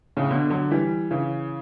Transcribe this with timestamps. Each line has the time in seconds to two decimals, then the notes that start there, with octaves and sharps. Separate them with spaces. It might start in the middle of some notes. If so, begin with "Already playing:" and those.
0.17 A2 C#3
0.30 B2 D3
0.50 D3 F#3
0.71 E3 G3
1.11 C#3 E3